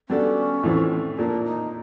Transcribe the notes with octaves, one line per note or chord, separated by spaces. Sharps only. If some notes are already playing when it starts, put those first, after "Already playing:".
G3 B3 C#4 D4 F#4 A4
A2 E3 A3 C4 F4
A#2 F3 A#3 D4
D#4